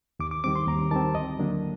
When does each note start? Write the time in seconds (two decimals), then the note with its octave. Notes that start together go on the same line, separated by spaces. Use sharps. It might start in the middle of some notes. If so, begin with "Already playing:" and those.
0.19 D#2 D6
0.31 D6
0.44 D#3 G3 C4 D6
0.56 C6
0.68 D#2 A#5
0.91 D#3 G3 C4 A5
1.14 D2 D#5
1.38 D3 F#3 A#3 D4